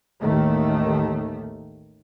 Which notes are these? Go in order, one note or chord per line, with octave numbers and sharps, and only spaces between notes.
A1 D#2 D#3 A3